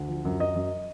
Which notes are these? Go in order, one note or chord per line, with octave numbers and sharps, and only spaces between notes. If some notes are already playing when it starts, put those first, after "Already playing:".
Already playing: D2
F3
F#2
F#2 D#5
F#2